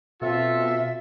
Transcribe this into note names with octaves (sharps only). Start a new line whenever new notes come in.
B2 C4 F4 A4 E5